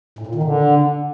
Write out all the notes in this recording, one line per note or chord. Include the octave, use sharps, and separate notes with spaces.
A2
A#2
D#3
D3